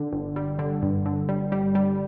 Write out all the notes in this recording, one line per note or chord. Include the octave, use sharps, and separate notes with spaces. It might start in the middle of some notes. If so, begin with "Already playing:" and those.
Already playing: D3
G1
G3
D3
G2
D3
G3
G3
G3